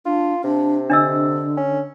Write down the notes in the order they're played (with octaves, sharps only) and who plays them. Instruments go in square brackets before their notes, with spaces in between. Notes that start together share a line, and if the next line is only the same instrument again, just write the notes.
[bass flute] D4 [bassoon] F4
[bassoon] C3 [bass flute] D4
[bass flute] D3 [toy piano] D4 D#5 E6
[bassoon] C#4